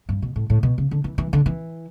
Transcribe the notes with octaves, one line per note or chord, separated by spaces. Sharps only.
G2
B2
A2
A2
B2
C#3
D3
E3
E3
D3
E3